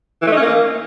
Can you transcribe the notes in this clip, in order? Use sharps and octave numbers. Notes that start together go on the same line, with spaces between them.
E3
A3
D#4
C#4
A#3